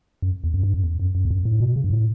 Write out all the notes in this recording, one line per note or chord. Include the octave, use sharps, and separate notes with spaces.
F#2
E2
F#2
G2
F#2
E2
F#2
F#2
E2
F#2
A2
B2
C#3
G2
A2